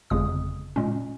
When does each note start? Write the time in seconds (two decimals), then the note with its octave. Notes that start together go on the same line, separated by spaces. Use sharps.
0.10 G1 F2 C#3 G#3 D#6
0.76 A#2 G#3 C#4